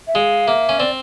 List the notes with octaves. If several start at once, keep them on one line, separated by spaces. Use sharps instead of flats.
E5
G#3 F5
A#3 E5
C#4
C4 D5